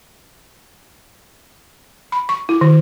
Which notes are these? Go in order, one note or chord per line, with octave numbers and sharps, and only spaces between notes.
B5
C#6
E4
D#3